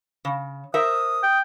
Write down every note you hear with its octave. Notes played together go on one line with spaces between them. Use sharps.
C#3
A#4 C5 E5 D#6
G5